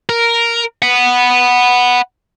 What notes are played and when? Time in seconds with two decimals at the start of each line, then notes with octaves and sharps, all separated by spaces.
0.09 A#4
0.82 F#5 B5